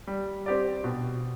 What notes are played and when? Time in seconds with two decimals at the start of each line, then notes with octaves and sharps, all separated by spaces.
0.07 G3
0.46 C4 G4 D5
0.84 B2